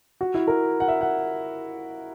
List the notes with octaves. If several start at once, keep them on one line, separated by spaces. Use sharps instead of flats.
F#4
E4
A#4
F#5
E5
F#5